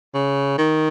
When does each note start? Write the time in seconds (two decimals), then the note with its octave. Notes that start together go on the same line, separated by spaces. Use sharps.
0.14 C#3
0.58 D#3